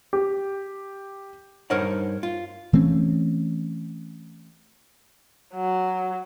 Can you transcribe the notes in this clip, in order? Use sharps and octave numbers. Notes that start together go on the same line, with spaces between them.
G4
G2 D#4 A#4 C5 C#5 F#5
F4
E3 A3 C4 C#4
F#3